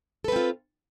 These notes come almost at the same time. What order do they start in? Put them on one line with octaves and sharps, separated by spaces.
A4 B4 C4 F4